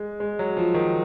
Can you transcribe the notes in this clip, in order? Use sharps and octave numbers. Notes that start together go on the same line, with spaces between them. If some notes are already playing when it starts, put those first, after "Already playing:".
Already playing: G#3
G#3
F#3
F3
D#3